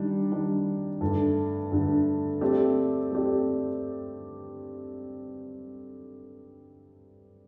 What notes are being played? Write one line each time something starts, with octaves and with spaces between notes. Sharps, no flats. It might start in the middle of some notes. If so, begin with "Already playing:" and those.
Already playing: D#3 G3 D4
D#3 G3 D4
G2 D3 A3
G2 D3 A3
A3 C4 G4 D5
A3 C4 G4 D5